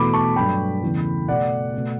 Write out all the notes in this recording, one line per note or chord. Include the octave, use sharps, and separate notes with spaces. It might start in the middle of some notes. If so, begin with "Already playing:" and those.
Already playing: E2 B2 A3 B5 D6
A5 C#6
G2 F#3 A3 G5 B5
E2 C#3 E3 A3
B2 A3 D5 F#5
B2 A3